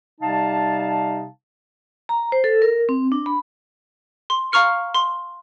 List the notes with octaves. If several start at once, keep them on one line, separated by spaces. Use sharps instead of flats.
C3 G3 D#4 F5 A5
A#5
C5
A4
A#4
C4
D4
B5
C6
F5 A#5 C#6 F6 C#7
C6